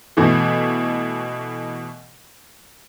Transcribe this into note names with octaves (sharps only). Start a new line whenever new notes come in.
B2 E3 A3